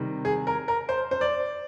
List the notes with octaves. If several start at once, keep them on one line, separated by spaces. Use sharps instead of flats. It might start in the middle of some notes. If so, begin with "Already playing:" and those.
Already playing: C3 D#3 G3
G#4
A#4
A#4
C5
C5
D5